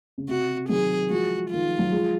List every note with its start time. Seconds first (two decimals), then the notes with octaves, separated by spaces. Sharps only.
0.18 C#3
0.28 C3 F#4
0.69 D#3 F#3 G#4
1.10 F3 G#3 F#4
1.50 D#3 F4
1.66 F3
1.79 F#3
1.91 F3 G#3